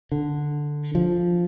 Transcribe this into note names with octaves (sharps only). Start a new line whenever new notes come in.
D3
F3